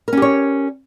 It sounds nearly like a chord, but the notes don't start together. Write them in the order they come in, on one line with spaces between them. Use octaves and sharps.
A#4 C#4 G4 C#5